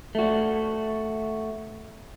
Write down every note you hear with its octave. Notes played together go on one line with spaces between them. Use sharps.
A3 F#4